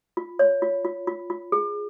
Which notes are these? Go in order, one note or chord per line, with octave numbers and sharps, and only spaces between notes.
F4
C#5
F4
F4
F4
F4
G#4